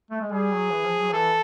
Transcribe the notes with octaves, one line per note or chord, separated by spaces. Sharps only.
A3
G#3
G3 G#4
F#3
E3
F3
F#3
E3 A4